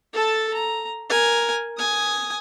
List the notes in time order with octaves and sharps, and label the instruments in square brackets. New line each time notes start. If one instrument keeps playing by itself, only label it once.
[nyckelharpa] A4 A5
A#5
A#4 G#5
G#5 D#6